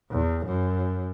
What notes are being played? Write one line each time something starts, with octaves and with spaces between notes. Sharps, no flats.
E2
F#2